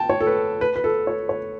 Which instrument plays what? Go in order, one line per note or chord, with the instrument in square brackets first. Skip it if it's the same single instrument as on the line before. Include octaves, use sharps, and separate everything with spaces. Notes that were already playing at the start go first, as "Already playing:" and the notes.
Already playing: [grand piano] G5 A5
C#5
A4
B4
B4
B4
A4
C#5
C#5